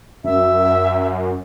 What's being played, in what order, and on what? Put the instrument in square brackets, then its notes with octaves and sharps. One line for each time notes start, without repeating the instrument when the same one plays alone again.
[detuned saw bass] F#2 [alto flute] E5